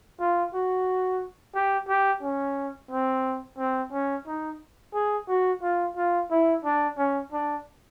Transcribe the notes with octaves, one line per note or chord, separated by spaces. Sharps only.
F4
F#4
G4
G4
C#4
C4
C4
C#4
D#4
G#4
F#4
F4
F4
E4
D4
C#4
D4